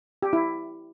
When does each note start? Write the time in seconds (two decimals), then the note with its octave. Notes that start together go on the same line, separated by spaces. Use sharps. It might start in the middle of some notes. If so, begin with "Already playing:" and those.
0.22 G4
0.33 E4